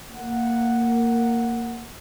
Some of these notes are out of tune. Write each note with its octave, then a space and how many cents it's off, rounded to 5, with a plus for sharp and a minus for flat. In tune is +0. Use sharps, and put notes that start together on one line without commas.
A#3 -10 F#5 +0